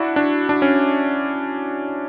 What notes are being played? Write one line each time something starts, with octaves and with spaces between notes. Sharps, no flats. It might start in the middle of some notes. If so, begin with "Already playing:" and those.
Already playing: D4 E4 F#4
D4
D4
C#4